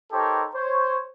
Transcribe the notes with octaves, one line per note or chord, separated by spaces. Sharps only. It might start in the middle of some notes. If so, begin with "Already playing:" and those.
D#4 G4 A4 A#4 C5 C#5
C5 C#5